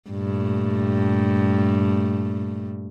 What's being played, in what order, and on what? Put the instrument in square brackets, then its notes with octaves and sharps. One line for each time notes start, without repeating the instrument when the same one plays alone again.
[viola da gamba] G2 A#2 A3